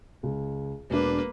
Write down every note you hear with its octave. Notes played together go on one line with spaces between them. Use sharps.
C#2
E1 A#3 D4 B4